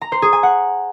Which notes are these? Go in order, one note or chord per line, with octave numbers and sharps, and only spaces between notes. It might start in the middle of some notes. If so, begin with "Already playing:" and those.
A#5
C5
G#4
G#5
F#5